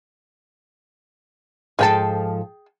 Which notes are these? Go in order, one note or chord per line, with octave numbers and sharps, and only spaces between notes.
G#2 F3 G#4 A4 G5 A5